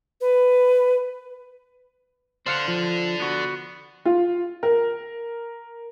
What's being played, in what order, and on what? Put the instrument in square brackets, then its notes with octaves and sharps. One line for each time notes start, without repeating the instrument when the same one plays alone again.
[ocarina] B4
[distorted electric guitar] D3 D4 [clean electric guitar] C5 F5 F#5
[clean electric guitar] F3
B3 F#4
[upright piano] F4
A#4